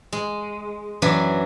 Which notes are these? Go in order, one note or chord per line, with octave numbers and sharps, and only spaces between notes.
G#3
F#2 E3 F#3 D4 E4